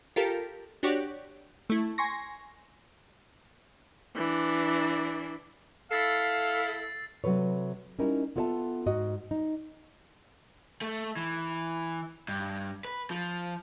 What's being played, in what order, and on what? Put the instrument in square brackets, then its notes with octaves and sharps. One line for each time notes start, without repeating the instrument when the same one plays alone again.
[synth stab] F4 G4 A4 A#4
D4 F#4 G4 C#5 D5
A3 E4
G#5 C6 C#6 A#6
[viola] E3 D4
[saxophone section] E4 A4 [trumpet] F5 [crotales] E6 A6 C7
[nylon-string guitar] C3 F#3 A4 B4 C#5
G3 C#4 D#4 E4 A#4
B3 F4 A4 C#5 E5 A5
G#2 F#4 D#5
D#4
[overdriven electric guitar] A3
E3
G2
B4
F3